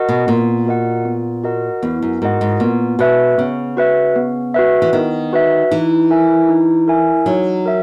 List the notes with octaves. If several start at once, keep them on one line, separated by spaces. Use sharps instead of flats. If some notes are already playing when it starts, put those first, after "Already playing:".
Already playing: F#4 A#4 D#5 F#5
B2
A#2 B3
F#4 A#4 D#5 F#5
B3
F#4 A#4 D#5 F#5
E2 B3
F#2
G#2 F#4 A#4 D#5 F#5
G#2
A#2 B3
B2 F#4 B4 E5
C#3 B3
F#4 B4 E5
B3
F#4 B4 E5
E3
D#3 B3
F#4 B4 E5
E3 D#4
A#4 E5 G#5
D#4
A#4 E5 G#5
F#3 D#4
A#4 E5